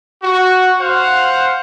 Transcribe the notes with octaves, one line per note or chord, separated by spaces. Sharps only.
F#4
C5 F5 F#5